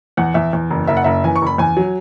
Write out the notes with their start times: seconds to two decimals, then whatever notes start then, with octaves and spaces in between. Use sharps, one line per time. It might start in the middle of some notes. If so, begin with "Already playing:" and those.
0.17 E2 F#5
0.34 E2 E5
0.53 E2
0.70 F#1
0.87 F#1 E5
0.97 F#5
1.04 F#1 E5
1.24 E3 G#5
1.36 C#6
1.42 F#1 B5
1.58 E2 G#5
1.77 F#3